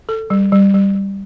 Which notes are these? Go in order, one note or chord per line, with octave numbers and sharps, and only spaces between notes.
A4
G3
G3
G3
G3